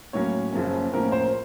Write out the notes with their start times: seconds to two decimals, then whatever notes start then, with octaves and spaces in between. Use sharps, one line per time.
0.13 A2 F#3 A#3 C#4 C#5
0.53 F#1 F#2 F3 A#3 C#4
0.92 A2 F3 A#3 C#4 A#4
1.12 C5